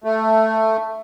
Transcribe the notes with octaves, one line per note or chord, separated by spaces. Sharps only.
A3